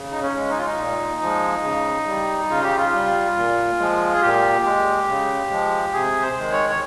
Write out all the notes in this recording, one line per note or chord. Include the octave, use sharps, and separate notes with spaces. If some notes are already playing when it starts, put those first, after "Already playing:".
Already playing: C#3
D#4
C#4
G#3
D#4
F4
D#4
A#2
F3 G#3
C#3
G3
C#3 F4
G4
F4
G3
A#2
F3 G#3
G#4
A#2 G4
G#3
C#3
F3 G#3
C3 G#4
C5
D#3 G#3
C#5
C#5